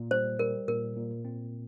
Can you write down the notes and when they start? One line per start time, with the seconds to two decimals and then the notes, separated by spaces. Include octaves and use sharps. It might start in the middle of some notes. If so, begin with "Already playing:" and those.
Already playing: A#2
0.11 G3 C5
0.39 G3 A#4
0.68 A#2 A#4
0.97 A#2
1.25 C4